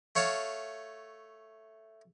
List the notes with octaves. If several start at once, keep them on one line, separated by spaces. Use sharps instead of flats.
A3 C#5 F5 A5